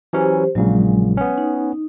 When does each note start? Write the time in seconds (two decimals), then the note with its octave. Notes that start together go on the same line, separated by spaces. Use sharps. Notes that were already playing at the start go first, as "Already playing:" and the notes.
0.13 E3 F#3 C#4 G4 C5
0.55 A#1 A#2 C#3 F#3 G#3
1.17 B3 C#4
1.38 D#4